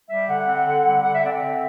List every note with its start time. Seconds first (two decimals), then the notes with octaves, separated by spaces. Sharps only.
0.08 G3 E5
0.27 D3 F#5
0.46 C4
0.65 D3
0.85 G3
1.04 D3 F#5
1.14 E5
1.23 C4 D5
1.32 E5
1.42 D3